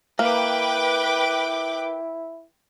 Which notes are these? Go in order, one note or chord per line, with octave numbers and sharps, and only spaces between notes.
A#3 E4 B4 G5 D6